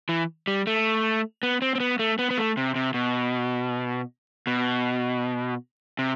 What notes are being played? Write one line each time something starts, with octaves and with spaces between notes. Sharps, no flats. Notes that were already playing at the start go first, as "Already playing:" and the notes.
E3
G3
A3
B3
C4
C4
B3
A3
B3
B3
A3
C3
C3
B2
B2
C3